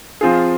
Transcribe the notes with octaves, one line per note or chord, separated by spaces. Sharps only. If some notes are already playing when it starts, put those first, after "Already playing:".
F3 C4 F4 G#4